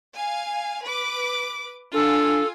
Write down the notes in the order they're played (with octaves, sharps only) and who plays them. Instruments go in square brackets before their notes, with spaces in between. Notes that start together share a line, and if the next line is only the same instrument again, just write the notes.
[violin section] F5 G#5
B4 D6
[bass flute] D4 [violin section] F4 G#5 [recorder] A4